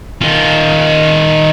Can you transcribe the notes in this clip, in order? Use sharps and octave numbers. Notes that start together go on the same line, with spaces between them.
D#3 F4